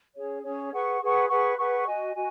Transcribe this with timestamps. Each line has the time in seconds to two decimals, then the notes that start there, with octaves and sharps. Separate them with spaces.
0.15 C#4 G#4 C#5
0.44 C#4 G#4 C#5
0.72 G#4 B4 F#5 C#6
1.01 G#4 B4 F#5 C#6
1.29 G#4 B4 F#5 C#6
1.57 G#4 B4 F#5 C#6
1.87 F#4 D#5 G#5
2.15 F#4 D#5 G#5